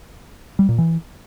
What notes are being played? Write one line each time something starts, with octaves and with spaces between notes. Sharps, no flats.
G3
A#2
E3